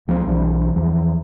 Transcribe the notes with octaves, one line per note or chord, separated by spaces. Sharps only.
C#2 F3 F#3 C4
B1 E3 G3 D4
E2 E3 F3